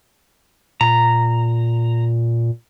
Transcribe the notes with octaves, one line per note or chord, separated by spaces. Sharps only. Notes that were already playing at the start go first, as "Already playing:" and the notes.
A#2 A#5